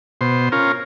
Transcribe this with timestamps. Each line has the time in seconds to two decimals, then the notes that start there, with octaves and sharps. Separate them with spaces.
0.21 B2 C5
0.52 C#4 F4 A#4